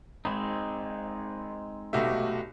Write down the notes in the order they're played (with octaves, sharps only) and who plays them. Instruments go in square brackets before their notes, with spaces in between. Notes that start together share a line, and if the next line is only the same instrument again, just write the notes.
[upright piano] G#1 B5 [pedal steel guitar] G#3 C4 D#4
[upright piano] F1 B1 A3 [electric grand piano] F#4 G4 E5